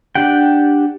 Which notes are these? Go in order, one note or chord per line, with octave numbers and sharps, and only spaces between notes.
D4 G4 F#5 G5